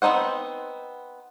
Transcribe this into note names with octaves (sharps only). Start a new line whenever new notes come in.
B3 C4 D#4 C5 F#5